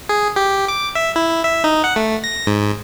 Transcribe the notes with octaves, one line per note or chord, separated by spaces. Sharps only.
G#4
G4
D6
E5
E4
E5
D#4
F#5
A3
A#6
G#2